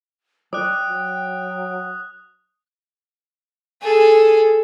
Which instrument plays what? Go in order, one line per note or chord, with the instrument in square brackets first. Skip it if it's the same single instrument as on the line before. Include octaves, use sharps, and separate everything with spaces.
[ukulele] D5 [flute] G5 [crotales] D#6 F#6
[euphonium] F#3
[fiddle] G#4 A4